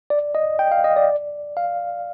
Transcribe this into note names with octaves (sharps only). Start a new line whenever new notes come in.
D5
D#5
G5
F5
D#5
D5
F5